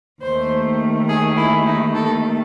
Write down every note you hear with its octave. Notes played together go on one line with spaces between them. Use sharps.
D#2 D#3 A3 C5
G#4
E4
D#4
A4